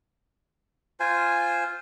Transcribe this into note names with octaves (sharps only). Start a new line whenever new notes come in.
F4 C5 G#5